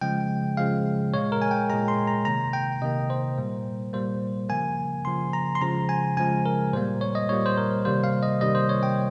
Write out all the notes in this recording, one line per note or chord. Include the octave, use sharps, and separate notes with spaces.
C#3 F3 G#3 G5
C#3 F3 G#3 F5
A#2 G#3 C#5
A#4
G#5
G5
A#2 G#3 A#5
C6
A#5
C3 D#3 A#3 A#5
G5
C3 D#3 A#3 D#5
C5
A#2 G3 A#3
A#2 G3 A#3 C5
C#3 F3 A#3 G#5
C#3 F3 A#3 C6
A#5
C6
C#3 F3 G#3 A#5
G#5
C#3 F3 G#3 G#5
A#4
A#2 G3 A#3 C5
C#5
D#5
A#2 G3 A#3 C#5
C5
A#4
C3 D#3 G3 A#3 C5
F5
D#5
C3 D#3 G3 A#3 D#5
C5
C#5
G5